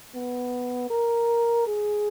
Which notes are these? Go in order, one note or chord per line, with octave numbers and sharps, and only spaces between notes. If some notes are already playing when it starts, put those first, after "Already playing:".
B3
A#4
G#4